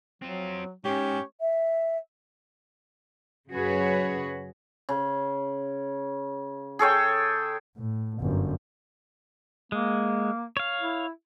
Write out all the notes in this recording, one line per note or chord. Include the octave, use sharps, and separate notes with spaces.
F#3 C4 F4
G#2 C#4 G4 C#5
E5
F#2 C#3 F#4 G#4 B4 C#5
C#3
G#4 A4 C#5 G5
A2
G1 F#2
G#3 A#3
C#5 F5
E4